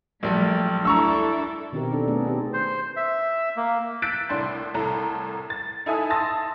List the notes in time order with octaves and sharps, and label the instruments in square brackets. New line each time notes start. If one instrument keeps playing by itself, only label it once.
[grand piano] A#1 [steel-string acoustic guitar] F#3 G3 A#3 [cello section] A3
[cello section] D4 E4 A4 [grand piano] A#5 C#6 E6
[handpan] B2 D#3 C4 D#4 G4 A#4
D4 A4
A3 B3 C#4 D4 G#4
B3 D#4 G4 G#4
[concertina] C5
E5
A#3
[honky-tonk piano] E6 F#6 G6 A6 B6 D7
C2 A2 D4 C6
C2 A2 A4 A#5
A6
D#4 E4 A4 E5 G#5 D#6
A5 C6 D#6 E6 A6 A#6